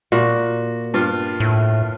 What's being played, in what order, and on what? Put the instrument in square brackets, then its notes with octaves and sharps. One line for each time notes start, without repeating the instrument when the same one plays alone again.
[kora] A#2 [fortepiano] F#4
[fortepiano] G2 F4
[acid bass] A2